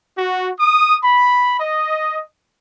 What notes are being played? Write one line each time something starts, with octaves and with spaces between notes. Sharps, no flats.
F#4
D#6
B5
D#5